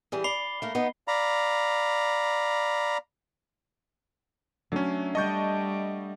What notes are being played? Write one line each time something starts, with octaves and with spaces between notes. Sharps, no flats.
E3 G3 G#4
D5 B5 C7 G7
A3 A#3 A#4
B3 D#4
D5 F5 A#5 B5
F#3 A3 C#4 D4
G3 D#5 F#5 A5 C#6 G6